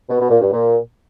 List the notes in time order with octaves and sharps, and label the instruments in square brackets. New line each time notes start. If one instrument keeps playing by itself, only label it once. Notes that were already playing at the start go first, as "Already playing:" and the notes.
[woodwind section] B2
B2
A#2
G2
A#2